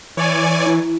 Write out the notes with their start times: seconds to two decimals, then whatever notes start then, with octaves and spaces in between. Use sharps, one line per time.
0.17 E3 C#5 D5 G#5
0.66 E4